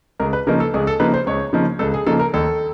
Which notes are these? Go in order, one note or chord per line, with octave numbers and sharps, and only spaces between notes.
C#2 A#4
B4
C#3 F3 A#3 D#4 A#4
A4
C#2 G#4
A4
C#3 F3 A#3 D#4 B4
C5
C#2 C#5
C#3 F3 A#3 D#4
C#2 A4
G#4
C#3 F3 A#3 D#4 A4
A#4
D#2 A4